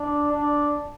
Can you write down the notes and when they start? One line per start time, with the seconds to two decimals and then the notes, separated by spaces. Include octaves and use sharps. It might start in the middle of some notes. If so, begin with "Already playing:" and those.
Already playing: D4
0.32 D4